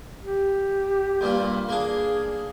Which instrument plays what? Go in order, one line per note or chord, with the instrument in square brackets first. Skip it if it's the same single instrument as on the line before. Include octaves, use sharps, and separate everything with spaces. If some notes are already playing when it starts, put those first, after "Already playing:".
[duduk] G4
[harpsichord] G2 A#2 A#3
[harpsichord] A#3 D4 [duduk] G#4